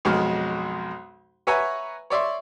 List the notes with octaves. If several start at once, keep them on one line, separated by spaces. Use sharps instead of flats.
B1 F2 G#3 F#4 F6
B4 C#5 E5 F#5 G#5 A#5
C#5 D5 E5 C6